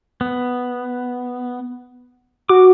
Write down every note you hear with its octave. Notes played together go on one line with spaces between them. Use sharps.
B3
F#4 D6